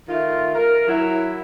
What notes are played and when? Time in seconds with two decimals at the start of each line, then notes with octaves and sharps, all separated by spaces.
0.08 D#3 A3 F4
0.55 A#4
0.87 F#3 E4